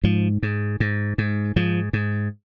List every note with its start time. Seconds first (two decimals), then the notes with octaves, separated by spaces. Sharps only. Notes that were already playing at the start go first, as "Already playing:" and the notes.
0.04 G#2 F3
0.43 G#2
0.80 G#2
1.18 G#2
1.56 G#2 F3
1.93 G#2